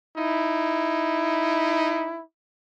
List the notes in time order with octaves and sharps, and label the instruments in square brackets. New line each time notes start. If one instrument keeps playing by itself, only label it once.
[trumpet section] D#4 E4